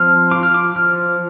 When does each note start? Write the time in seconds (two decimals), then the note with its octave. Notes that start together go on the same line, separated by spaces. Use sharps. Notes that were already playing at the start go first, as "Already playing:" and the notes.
Already playing: F3 C4 F6
0.31 F4 D6
0.43 F6
0.54 D6
0.76 F3 F6